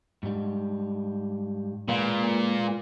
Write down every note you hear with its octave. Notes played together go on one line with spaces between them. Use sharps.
G#2 G3
A#2 G#3 B4 F5